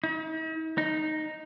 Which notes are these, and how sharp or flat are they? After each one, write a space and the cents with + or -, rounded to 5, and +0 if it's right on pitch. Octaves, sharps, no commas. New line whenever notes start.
D#4 +45
D#4 -5